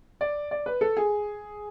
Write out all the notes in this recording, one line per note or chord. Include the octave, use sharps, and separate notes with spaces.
D5
D5
B4
A4
G#4